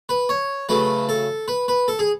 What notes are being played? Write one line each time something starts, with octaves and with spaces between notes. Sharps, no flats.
B4
C#5
C#3 F#3 A3 B4
A4
B4
B4
A4
G#4